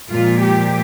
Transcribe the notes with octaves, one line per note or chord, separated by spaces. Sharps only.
A#2 F3 G#3 F4
G4